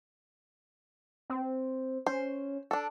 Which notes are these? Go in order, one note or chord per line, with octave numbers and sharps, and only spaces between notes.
C4
C#4 C5
D4 A4